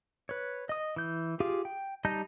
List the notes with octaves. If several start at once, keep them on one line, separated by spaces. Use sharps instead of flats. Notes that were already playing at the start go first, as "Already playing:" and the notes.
B4 C#5
D#5 D#6
E3 G6
F4 G4 G#4 F5
G5
G3 D#4 D#5 A5 G6